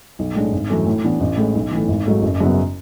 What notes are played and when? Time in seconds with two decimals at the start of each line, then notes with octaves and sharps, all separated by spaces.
0.19 B1
0.35 A2 G#3 D4
0.52 G#1
0.70 F#2 E3 A3
0.87 A2
1.04 E3 B3 D4
1.21 A1
1.37 A2 G#3
1.55 B1
1.71 A2 E3
1.88 G#1
2.06 G#2 F#3 A3
2.22 F#1
2.40 F#2 C#3 F#3 B3